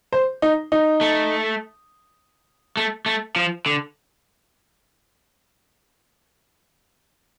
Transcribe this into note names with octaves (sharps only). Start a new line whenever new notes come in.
C5
D#4
D#4
A3
A3
A3
F3
D3